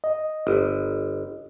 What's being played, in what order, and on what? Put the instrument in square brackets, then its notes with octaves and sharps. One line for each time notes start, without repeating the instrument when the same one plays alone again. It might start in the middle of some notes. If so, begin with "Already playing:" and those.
[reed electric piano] D#5
[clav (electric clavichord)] G1